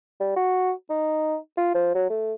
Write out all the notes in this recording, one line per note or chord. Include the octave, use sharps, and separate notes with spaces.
G3
F#4
D#4
F4
F3
F#3
A3